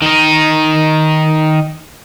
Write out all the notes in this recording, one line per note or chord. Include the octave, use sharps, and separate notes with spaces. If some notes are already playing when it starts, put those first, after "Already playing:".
D#3 D#4